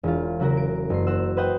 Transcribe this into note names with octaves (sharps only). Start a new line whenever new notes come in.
E1 F4
C#3 F#3 F#4 A#4
D7
F#1 C7
F#4 C5 E6
B4 C5 D#5 F#5 G5